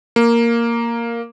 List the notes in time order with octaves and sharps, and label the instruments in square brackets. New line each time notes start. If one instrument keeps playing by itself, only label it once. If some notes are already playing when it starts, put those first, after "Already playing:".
[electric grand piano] A#3